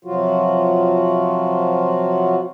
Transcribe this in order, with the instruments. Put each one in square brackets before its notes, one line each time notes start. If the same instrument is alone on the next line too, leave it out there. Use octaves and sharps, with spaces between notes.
[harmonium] C3 F3 F#3 F4 F#4